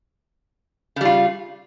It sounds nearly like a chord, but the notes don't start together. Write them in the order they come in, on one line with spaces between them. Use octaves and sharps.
C#3 G3 F4